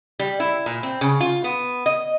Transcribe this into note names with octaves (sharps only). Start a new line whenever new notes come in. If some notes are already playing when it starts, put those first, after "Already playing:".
G3
E4
A#2
C4
C#3
F4
B3
D#5